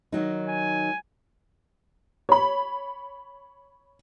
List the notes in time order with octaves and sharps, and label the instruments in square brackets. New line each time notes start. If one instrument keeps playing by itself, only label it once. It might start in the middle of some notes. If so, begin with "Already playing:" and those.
[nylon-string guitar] D#3 F#3 D#4
[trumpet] G#5
[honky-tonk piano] C#5 B5